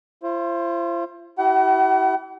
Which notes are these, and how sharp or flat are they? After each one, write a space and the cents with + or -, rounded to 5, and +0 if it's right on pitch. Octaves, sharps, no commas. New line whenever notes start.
F4 -45 C5 +20
E4 -15 G4 -40 F#5 +40